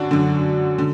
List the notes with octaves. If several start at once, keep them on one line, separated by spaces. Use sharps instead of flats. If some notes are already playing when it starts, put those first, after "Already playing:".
Already playing: F#2 D3 D4 F#4
F#2 D3
D3